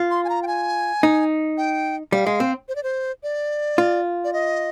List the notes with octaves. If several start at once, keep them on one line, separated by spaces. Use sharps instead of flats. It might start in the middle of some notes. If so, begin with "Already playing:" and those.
Already playing: F4
C6
G#5
A#5
G5
G#5
D#4
G5
G3 F5
G#3
C4
C5
D5
C5
D5
F4
D5
D#5